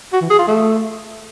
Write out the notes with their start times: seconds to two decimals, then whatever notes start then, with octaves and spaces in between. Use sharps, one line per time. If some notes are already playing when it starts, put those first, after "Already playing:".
0.13 F#4
0.21 E3
0.30 G#4
0.39 F4
0.47 A3